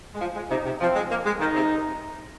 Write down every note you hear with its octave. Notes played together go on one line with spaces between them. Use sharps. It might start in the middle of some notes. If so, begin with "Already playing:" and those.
G#3
F3
G#3
C3 D#4
C3
F3 C4
G#3
A#3
G#3
D#3 D#4
C3